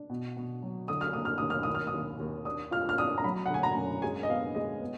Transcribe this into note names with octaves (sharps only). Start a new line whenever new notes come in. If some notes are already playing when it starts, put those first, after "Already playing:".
Already playing: D4
B2
B2
F#3
D3 D#6
F6
A#3 D#6
F6
D#2 D#6
F6
D#2 D#6
F6
D#6
D#2
D#2
D4 D#6
F4 F6
F6
D4 D#6
A#5
F#3 B5
F#5
D3 G#5
A#5
F#2
G#3 G#5
D#5
B3 F5
G#3 D#5
B3